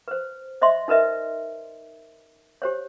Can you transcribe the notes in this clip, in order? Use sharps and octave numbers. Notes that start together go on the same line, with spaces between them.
B4 C5
C5 D#5 E5 C6
D#4 A#4 B4 D#5 E5
G4 C5 C#5